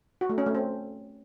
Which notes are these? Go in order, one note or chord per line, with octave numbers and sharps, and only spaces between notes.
F#4
A3
C#4
A3
C4